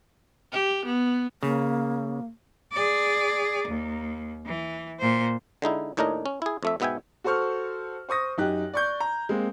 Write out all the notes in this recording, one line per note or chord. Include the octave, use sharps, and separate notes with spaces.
G4
B3
C#3 A#3
G#4 D5
D#2
E3
A#2 C5
D3 G#3 D#4 E4
D#2 A2 D4 D#4 A#4 D#5
C#4
E4 G#4
F2 A3 E5
G#2 B2 B3 E5 G5 G#5
F#4 A4 C5 C#6 F6
C5 C#6 D#6 A#6
F#2 D#4 G4 F#6
D5 C#6 G6
A#5
G#3 A#3 C4